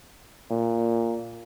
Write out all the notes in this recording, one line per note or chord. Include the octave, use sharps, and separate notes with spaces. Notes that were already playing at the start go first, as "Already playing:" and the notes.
A#2